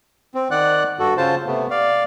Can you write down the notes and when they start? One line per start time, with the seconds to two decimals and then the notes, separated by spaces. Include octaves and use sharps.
0.35 C4
0.51 D#3 D5 F#5 F#6
0.99 G2 F#4 A4
1.17 C#3 F4 C5 A5
1.46 C3 A3 B3
1.70 D5 F5